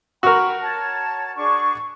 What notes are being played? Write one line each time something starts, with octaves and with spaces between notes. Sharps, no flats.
F#4 A#4 G5 B5 C#6
C#5 A5
D4 G#4 C#6